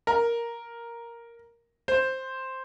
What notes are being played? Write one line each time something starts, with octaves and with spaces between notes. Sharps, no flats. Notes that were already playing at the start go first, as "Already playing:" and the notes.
A#4
C5